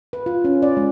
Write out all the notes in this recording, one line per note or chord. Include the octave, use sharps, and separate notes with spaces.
B4
F4
C#4
D5
G#3